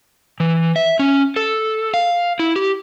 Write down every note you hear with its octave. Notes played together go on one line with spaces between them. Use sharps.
E3
E5
C#4
A4
F5
E4
G4